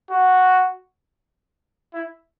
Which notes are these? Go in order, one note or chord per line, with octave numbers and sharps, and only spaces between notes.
F#4
E4